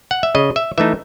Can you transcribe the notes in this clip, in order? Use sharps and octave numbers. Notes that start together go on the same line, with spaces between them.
F#5
E5
C#3 D#5
E5
E3 A3 D#4 E5